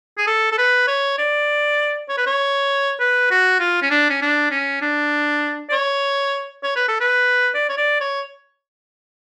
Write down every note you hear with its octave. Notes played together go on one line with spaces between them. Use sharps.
G#4
A4
A4
B4
C#5
D5
C#5
B4
C#5
B4
F#4
F4
C#4
D4
C#4
D4
C#4
D4
D5
C#5
C#5
B4
A4
B4
D5
C#5
D5
C#5